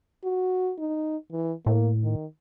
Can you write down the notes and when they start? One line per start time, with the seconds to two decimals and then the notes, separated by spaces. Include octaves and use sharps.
0.24 F#4
0.78 D#4
1.31 E3
1.66 A2 A#3
2.03 D#3